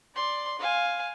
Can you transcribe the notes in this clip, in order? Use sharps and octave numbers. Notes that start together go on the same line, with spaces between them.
D5 C6
F5 G#5